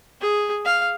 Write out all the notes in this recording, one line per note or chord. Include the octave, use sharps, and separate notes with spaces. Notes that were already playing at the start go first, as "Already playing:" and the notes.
G#4
F5